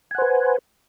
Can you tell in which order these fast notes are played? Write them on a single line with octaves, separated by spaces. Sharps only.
G#5 F#5 C5 B4